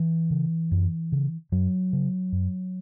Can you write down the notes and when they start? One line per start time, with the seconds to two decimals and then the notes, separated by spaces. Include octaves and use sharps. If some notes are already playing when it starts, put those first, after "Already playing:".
Already playing: E3
0.30 C#3
0.71 F#2
1.12 C#3
1.52 F#2 F#3
1.93 C#3
2.32 F#2